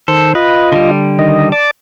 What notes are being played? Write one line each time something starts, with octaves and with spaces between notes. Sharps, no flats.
D#3 A4 C5
F4 B4 D#5
D3 G3
D#3 D#5
D5 A5 D6